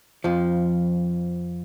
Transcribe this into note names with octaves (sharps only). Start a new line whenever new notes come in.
F2 F3